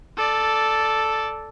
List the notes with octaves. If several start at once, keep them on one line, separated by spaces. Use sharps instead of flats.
A4 D5